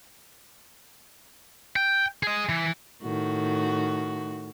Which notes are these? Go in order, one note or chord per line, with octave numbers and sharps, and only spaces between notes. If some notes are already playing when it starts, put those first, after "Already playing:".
G5
G#4 D#5
E3
A2 D#3 F#4